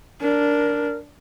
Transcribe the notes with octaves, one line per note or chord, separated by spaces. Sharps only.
D4 A#4